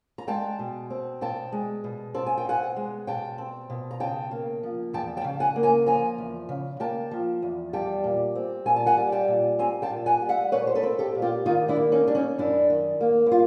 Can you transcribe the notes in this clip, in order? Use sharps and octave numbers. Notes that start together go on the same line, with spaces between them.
A#5
G#3 G5 A5
B2
C4
B2 G5 A5
G#3
B2
C4 A5
G#5
G5
B2 F#5 G#5
G#3
B2 G5 A5
C4
B2
A#5
C#3 G5 A5
A#3
F3
E2 G5 A5
G5 A5
C#3
F#5 G#5
A#3
G#5 A#5
F3 G#5 A#5
E2
C#3
A#3 G5 A5
F3
E2
G3 G5 A5
A#2
C4
A#2 G#5
A5
F#5 G#5
G3
G5 A5
A#2
C4 G#5 A#5
G5 A5
A#2
F#5 G#5
G3
E5 F#5
A#2 B4 C#5
C5
A4 B4
C4
G4 A4
A#2
F4 G4
D#3 D#4 F4
D4 E4
A#3
C#4 D#4
G3 D4
C#4 D#4
F#2 D4 E4
D#3
A#3
E4
G3 F4